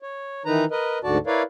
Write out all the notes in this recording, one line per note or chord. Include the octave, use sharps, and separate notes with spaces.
C#5
D#3 E3 D#4 B4 A#5
A#4 B4 D#5
D2 G#2 D3 F#4 D5 A5
E4 A#4 B4 C#5 D5 F5